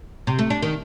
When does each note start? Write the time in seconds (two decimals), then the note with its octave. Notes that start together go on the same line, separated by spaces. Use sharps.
0.27 C3
0.39 A3
0.50 D4
0.62 D#3